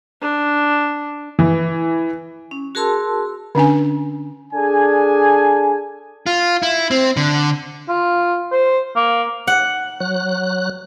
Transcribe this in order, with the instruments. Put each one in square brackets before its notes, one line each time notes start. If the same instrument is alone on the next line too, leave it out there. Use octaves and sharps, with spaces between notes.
[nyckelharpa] D4
[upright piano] E3
[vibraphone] C#4
F#4 G#4 A#4 A5 C6 E6
[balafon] D3 C#4 D4 G#5
[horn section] D4 G#4 A4 G#5
[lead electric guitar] F4
E4
C4
D3
[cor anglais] F4
C5
A#3
[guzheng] F#5
[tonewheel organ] F#3 F#6